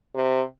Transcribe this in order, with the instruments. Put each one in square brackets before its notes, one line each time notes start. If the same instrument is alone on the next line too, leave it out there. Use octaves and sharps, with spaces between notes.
[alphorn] C3